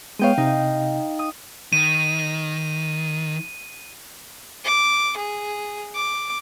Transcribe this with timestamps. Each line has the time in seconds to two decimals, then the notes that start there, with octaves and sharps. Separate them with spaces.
0.19 G#3 B3 C#5 F5 G5 D#7
0.38 C3 D#4
1.19 D#6
1.73 D#3 D#7
4.65 D6
5.17 G#4
5.95 D6